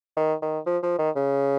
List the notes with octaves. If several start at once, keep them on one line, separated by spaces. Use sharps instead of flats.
D#3
D#3
F3
F3
D#3
C#3